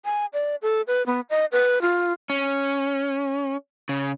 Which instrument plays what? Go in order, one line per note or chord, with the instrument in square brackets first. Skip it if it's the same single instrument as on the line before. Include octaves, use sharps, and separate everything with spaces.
[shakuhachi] G#5
D5
A4
B4
B3
D#5
B4
F4
[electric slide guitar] C#4
C#3